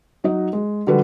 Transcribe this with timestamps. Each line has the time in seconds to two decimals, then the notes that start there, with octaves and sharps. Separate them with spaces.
0.24 F#3 D#4 F#4 D#5
0.53 G#3
0.87 D3 F3 G3 F#4 A4 B4